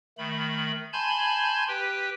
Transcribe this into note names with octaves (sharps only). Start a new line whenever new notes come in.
D#3 A3 B5
G#5 A5 B5 C6 G6 G#6
G4 B4 G5